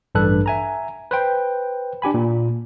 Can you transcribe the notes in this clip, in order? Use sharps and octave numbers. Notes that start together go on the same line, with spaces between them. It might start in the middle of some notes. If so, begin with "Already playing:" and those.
A1 G2 D4 A4 B4 F#6
E5 G#5 A#5
B4 C5 G5
D4 G4 G#5 B5
A#2